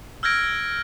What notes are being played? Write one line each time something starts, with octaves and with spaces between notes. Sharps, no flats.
E6 F6 G6 G#6 A#6 D7